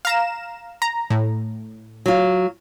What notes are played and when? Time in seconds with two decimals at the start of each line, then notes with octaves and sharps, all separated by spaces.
0.05 F5 A#5 E7
0.82 A#5
1.10 A2
2.06 F#3 F4